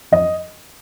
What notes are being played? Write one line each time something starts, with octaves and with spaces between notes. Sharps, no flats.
F2 D#5